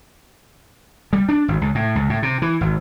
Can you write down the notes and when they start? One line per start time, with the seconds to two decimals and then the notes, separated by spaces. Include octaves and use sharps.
1.13 G3
1.29 D4
1.48 G#1
1.61 C#2
1.75 A2
1.95 C#2
2.10 A2
2.22 C3
2.42 E3
2.61 G#1